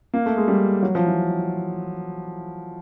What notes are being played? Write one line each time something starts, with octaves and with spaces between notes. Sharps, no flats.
A#3
A3
G#3
G3
F#3
F3
E3